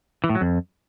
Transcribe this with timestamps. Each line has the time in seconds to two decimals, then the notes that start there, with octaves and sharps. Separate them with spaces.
0.24 E3
0.29 A2
0.35 F#3
0.41 F2